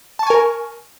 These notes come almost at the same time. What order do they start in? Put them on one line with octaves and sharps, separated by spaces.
A5 C#6 G#5 A#4